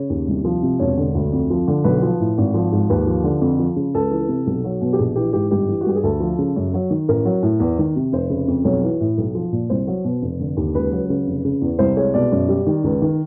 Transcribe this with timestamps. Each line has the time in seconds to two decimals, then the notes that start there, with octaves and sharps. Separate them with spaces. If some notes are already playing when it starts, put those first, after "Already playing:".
Already playing: C#3 C#5
0.10 D#2
0.27 C2
0.44 F3
0.63 C3
0.79 E1 C#5
0.97 D3
1.15 D2
1.33 F2
1.50 F3
1.68 D3
1.84 B1 B4
2.02 F3
2.20 A2
2.38 G#1
2.54 F3
2.72 G#2
2.90 D#2 B4
3.07 F3
3.24 D3
3.41 F2
3.59 F3
3.76 C#3
3.95 C#2 A4
4.11 E3
4.28 C3
4.46 B1
4.64 F#3
4.81 B2
4.93 G4
4.99 A#1 G#4
5.16 E3 G4
5.33 G#2 G4
5.51 G1 G4
5.69 E3
5.81 F#4
5.86 G2 G4
5.95 G#4
6.03 D2 A4
6.20 F3
6.38 C#3
6.56 F#2
6.74 F#3
6.90 D#3
7.08 A1 A#4
7.25 F#3
7.43 A2
7.60 E2
7.78 D#3
7.96 C3
8.12 F1 C5
8.30 C#3
8.48 F2
8.64 B1 C#5
8.83 E3
9.00 A2
9.18 B1
9.35 F3
9.52 A#2
9.70 C2 C5
9.87 F#3
10.04 B2
10.22 F1
10.40 D3
10.57 D#2
10.75 C#2 B4
10.92 F#3
11.10 C#3
11.27 F1
11.44 C#3
11.61 E2
11.79 C2 C5
11.97 G#3 C#5
12.14 B2 D5
12.32 F#2
12.48 G3
12.66 D#3
12.84 C#2
13.02 D#3